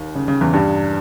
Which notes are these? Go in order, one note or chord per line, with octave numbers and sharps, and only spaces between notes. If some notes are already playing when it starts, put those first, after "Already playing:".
Already playing: D#2
C#3
C#3
E2 E3
G2 G3